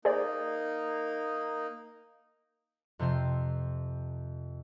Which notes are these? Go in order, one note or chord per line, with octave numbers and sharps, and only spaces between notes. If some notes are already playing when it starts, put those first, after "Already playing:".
A#3 D#4 G#4 C5 D5
F2 C3 C5 G5 C7